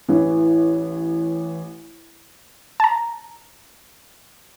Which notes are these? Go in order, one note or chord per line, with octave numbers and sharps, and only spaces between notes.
A1 E3
A5 A#5